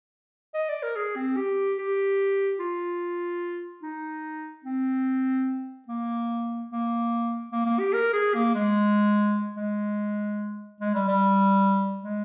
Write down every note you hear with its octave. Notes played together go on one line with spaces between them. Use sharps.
D#5
D5
A#4
G#4
C4
G4
G4
F4
D#4
C4
A#3
A#3
A#3
A#3
G4
A#4
G#4
A#3
G#3
G#3
G#3
G3
G3
G#3